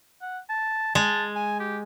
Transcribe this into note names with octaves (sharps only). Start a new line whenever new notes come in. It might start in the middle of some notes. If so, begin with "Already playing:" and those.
F#5
A5
G#3 A5
G#5
G4